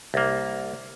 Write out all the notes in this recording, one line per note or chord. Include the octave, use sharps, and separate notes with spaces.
C2 A#3